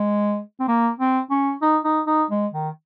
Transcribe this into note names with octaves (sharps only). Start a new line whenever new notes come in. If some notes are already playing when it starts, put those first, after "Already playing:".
Already playing: G#3
C4
A#3
C4
C#4
D#4
D#4
D#4
G#3
D#3